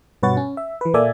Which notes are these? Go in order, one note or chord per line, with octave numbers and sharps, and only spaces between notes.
G2 B2 B4 C#5 F#5 A6
C#4
E5
E3 B4
A#2 A#3 A4 D5 E5 G#5